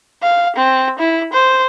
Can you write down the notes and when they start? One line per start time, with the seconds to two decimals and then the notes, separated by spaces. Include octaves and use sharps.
0.23 F5
0.56 C4
0.99 E4
1.33 C5